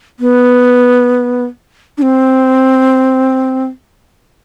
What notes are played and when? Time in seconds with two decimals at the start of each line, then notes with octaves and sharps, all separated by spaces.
0.20 B3
1.98 D4
2.02 C4